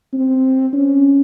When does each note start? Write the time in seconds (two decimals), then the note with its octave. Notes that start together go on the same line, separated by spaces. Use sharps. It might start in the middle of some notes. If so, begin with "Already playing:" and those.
0.13 C4
0.73 C#4